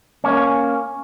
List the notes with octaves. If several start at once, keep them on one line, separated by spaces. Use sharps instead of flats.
A#3 C#4